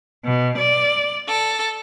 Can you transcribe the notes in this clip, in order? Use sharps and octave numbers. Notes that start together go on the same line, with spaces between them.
B2
D5
A4